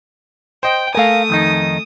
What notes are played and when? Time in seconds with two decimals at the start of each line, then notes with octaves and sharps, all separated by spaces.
0.63 C5 D#5 G5
0.95 A3 A#4 F5 G#5 D#6
1.30 F2 D#3 D#4